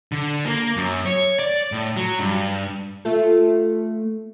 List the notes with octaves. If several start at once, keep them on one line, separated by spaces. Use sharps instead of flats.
D3
A#3
F#2
C#5
D5
A2
F#3
G2
A3 F4 A4